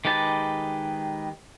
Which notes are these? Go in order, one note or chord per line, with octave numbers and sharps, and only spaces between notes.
D#3 G#3 G4 B4 A5